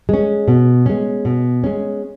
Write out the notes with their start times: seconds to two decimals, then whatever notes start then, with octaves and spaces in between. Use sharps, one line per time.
0.09 G#3 C#4
0.48 B2
0.86 G#3 C#4
1.25 B2
1.64 G#3 C#4